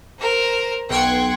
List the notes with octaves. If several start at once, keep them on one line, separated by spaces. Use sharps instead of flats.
A#4 C5
B1 F#5 G5 C6 G#6